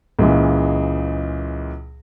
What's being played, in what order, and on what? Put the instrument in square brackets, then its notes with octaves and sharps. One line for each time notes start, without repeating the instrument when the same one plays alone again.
[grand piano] C#2 A#2 E3 G#3